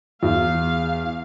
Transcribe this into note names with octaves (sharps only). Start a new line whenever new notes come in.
E2 F5